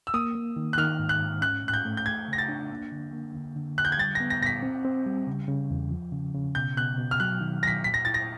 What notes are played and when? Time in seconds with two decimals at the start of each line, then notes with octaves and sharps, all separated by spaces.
0.07 E6
0.14 A#3 D#6
0.35 A#3
0.56 D#3
0.73 F#6
0.78 D#3 F6
0.99 G#2
1.09 F#6
1.20 G#2
1.41 C#4 F#6
1.64 A2 F#6
1.74 G6
1.85 A3
1.97 G6
2.06 A3 G#6
2.28 C#3 A#6
2.38 A6
2.48 D4
2.71 A#3
2.92 D3
3.13 A#3
3.35 D3
3.56 D3
3.78 D3 F#6
3.85 G6
3.92 G#6
3.98 G3 A6
4.15 B3 A#6
4.30 A#6
4.42 A#2 A#6
4.46 B6
4.63 C4
4.85 C4
5.06 G3
5.27 C#3
5.48 C#3
5.71 E2
5.91 F3
6.12 C#3
6.35 C#3
6.55 B2 G6
6.77 B2 F#6
6.98 B2
7.11 F6
7.20 F#3 F#6
7.41 D#3
7.62 F#3 A#6
7.67 B6
7.83 A#2 B6
7.94 A#6
8.05 E4 A6
8.14 A#6